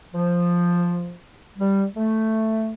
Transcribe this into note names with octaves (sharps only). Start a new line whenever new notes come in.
F3
G3
A3